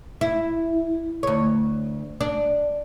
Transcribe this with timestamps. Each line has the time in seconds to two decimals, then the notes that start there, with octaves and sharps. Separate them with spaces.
0.21 E4
1.23 D2 C#5
2.21 D4